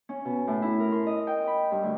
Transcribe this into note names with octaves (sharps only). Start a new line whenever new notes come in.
C#4
B2
A2
E4
A#4
C6
D#5
G5
B5
G2
D2